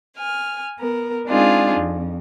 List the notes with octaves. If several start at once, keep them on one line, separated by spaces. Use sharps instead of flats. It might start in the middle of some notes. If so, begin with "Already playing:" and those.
G#5 F6
B3 A#4
G#3 C4 D4 D#4 F4 G#4
F2